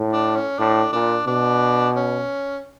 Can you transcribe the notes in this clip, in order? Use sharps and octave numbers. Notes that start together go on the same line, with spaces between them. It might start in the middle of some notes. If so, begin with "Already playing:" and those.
Already playing: A2
D4
C#4
A2 D4
A#2 D4
B2 D4
C#4